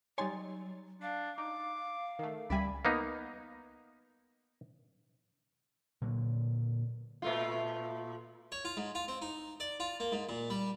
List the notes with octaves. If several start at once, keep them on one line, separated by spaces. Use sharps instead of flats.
F#3 G3 D#4 C#5 G#5 C6 A6
D4 F5
D#4 D6
D#3 A3
C#2 G3 D5 E5 G#5 B5
A#3 B3 D#4
A#2 D3 F#3
A#2 A3 F4
C#5
F4
G#2
F4
C4
D#4
D5
F4
A#3
G#2
A#2
G3